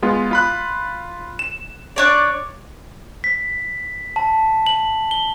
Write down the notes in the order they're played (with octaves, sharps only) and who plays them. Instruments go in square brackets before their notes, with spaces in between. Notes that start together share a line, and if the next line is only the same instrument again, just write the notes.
[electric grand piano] G#3 B3 F4
F4 B5 F#6
E7
[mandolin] D4 C#5 D5
[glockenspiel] B6
A5
F#7
G7